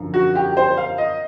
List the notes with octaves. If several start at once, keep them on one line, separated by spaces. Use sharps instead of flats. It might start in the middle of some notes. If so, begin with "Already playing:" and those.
Already playing: F#2 D3 F3
F#4
G4
C5
F5
D#5